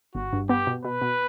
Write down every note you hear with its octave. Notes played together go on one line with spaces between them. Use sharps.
G1 F#4
G2
B3 G4
B2
B2 B4
B2